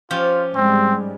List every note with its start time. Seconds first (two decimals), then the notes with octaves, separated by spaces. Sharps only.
0.11 F3 C#4 F4 G4
0.55 G#2 G3 G#3 C4